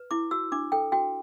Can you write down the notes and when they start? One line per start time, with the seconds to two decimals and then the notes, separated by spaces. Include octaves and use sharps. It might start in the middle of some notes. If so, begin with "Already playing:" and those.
Already playing: B4
0.11 E4 D6
0.31 F#4 E6
0.52 D4 D6
0.72 A4 G5
0.92 F#4 G5